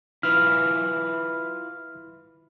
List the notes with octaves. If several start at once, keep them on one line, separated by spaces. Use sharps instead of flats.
E4 F4 B4 F6